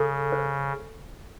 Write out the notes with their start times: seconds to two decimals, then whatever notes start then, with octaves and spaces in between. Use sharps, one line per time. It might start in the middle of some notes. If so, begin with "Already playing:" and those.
Already playing: C#3 A4
0.32 C5